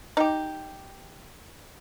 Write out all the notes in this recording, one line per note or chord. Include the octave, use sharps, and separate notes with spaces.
D#4 G4